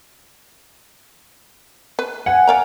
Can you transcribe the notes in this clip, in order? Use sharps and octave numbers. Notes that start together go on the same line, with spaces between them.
B4
F#5 G#5
D5 F5 A#5